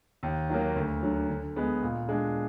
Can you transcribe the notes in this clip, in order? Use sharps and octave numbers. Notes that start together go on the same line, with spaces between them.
D#2
D#3 F#3 A#3
D2
D3 F#3
D3
G#3 B3
A#2
G#3 D4